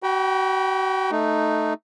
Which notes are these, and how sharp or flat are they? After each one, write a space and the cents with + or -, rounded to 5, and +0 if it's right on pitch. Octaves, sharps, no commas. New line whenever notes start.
F#4 +35 G5 -5 B5 -35
A3 +0 D#4 -10